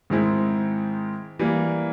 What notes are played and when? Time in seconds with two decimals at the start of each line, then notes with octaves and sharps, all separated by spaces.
0.10 G#2 D#3 G#3 C4 E4
1.39 E3 G3 A#3